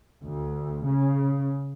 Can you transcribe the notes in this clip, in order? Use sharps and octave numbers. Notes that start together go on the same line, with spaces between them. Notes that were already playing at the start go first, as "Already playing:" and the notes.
D2
C#3